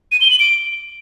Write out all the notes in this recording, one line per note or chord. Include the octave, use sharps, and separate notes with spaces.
D#7
G7
F#7
D7